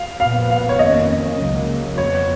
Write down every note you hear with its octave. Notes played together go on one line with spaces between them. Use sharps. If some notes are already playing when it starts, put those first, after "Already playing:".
Already playing: F5
A#2 F3 B3 F5
F5
C#5
F2 D#3 A#3 C#4 D#5
C#2 C#3 F#3 A#3
F2 F3 B3 C#5